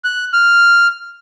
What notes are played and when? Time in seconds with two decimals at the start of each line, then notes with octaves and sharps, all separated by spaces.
0.04 F#6
0.33 F6